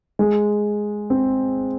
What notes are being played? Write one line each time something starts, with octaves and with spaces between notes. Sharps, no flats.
G#3
C4